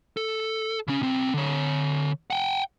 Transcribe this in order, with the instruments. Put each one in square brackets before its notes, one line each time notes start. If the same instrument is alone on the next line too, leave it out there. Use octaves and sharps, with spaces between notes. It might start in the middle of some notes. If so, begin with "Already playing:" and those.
[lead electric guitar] A4
C#3 C#4
B1 C4
D3 C#5
F#5 G5